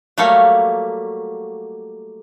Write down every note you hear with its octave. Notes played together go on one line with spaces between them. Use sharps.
F#3 G3 A3 A#3 C#5 F5